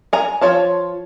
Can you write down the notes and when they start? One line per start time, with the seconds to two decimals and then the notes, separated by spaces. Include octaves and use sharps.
0.13 G#5 A#5
0.41 F3 F4 C#5 A5